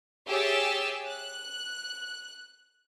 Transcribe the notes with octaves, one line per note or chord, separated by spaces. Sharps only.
G4 G#4 C#5 E5 E6 A6
F#6